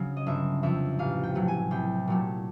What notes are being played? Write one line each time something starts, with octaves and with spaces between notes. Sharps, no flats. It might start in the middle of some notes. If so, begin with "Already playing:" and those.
Already playing: C#3 F#3
D#5
G1 E5
F2 C3 E5
A1 F5
G5
A2 F#3 A3
G#5
C2 G5
A#2 F#3 A3